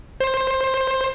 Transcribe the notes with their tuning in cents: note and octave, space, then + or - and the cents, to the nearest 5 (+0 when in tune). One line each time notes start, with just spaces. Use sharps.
C5 +15